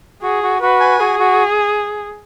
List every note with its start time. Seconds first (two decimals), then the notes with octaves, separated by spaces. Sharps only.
0.23 F#4 G#4
0.43 F#4
0.62 F#4 B4
0.80 G#5
1.00 F#4 G#4
1.19 F#4